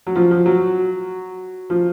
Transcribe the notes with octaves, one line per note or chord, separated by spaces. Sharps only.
F#3
F3
F3
F#3
F3